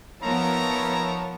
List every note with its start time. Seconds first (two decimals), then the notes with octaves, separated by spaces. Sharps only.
0.22 F3 B3 D#4 A#4 C#5 E5 A5 A#5